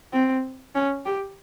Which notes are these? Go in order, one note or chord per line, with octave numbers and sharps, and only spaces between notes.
C4
C#4
G4